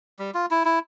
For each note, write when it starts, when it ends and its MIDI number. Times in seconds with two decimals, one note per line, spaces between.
0.19 0.31 55
0.34 0.46 65
0.51 0.63 64
0.65 0.79 64